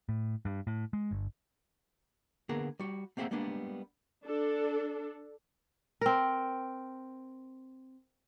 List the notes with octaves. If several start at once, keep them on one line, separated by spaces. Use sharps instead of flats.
A2
G2
A2
G#3
G1
D3 A#3 B3 G#4 A#4
G3 F#4
A3 A#3 C4 G#4 E5 F#5
G3 G#3 A#3 B3 D4
D4 A4
C4 A#4